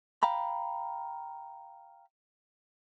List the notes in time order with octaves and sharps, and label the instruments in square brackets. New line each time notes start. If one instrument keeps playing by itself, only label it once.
[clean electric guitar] F5 G5 A#5 B5